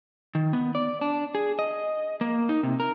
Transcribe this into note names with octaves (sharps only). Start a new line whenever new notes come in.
D#3
B3
D5
D4
G#4
D#5
A#3
D#4
C3
A#4